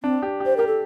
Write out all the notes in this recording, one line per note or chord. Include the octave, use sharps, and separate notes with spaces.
C4 D4
G4
G4
C5
G4 A#4
A4